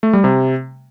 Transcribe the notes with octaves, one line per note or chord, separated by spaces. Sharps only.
A3
G3
C3